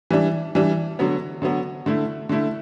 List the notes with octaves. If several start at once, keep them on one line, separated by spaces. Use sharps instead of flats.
E3 G3 D4
E3 G3 D4
D3 F#3 B3
D3 F#3 B3
D3 A3 E4
D3 A3 E4